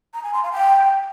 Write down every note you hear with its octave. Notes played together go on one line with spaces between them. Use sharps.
A#5
G#5
C6
F5
G5